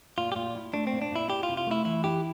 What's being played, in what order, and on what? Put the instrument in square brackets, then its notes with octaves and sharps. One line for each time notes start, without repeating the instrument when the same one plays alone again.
[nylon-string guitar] A#2 [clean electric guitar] F4
[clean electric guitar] G4
[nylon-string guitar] A#2 [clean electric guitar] F4
[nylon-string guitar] E4
[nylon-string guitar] A3 [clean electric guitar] D4
[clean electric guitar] C4
[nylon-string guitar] A#2
[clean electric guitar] D4
[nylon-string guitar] A#2 [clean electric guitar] E4
[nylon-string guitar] E4 [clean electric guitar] G4
[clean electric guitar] F4
[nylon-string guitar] C3
[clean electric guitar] F4
[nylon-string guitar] A3 [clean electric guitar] E4
[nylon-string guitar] E3 [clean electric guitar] E4
[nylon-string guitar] E4 [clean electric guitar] G4